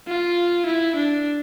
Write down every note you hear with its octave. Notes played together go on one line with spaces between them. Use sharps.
F4
E4
D4